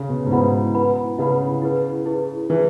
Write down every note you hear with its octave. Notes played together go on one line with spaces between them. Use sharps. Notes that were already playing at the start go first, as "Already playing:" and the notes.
Already playing: C#3
B2
G#2
B2 E4 B4 F#5 B5
E4 B4 F#5 B5
C#3 E4 B4 F#5 B5
E4 G#4 B4
E4 G#4 B4
E3 E4 G#4 B4